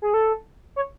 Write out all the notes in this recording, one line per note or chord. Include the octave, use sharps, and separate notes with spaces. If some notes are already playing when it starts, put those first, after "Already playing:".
G#4
A4
C#5